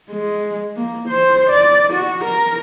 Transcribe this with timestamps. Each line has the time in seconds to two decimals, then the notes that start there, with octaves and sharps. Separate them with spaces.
0.10 G#3
0.77 A#3
1.08 C5
1.50 D5
1.93 F#4
2.24 A#4